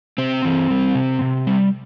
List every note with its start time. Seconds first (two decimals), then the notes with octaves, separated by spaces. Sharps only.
0.18 C3 C4
0.45 E3
0.70 G3
0.95 C3
1.21 C3
1.47 G3